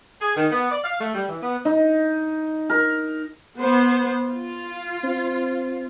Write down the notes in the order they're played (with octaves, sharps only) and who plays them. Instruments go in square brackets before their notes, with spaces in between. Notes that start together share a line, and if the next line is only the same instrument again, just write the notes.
[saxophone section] G#4
D#3
B3
D5
F5
A3
G3
E3
B3
[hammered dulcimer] D#4
A#4
[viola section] B3 C5
F4
[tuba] C4